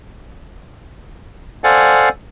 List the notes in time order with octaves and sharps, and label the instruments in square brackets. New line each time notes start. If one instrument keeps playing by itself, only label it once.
[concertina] A4 C5 D5 F5 F#5 G#5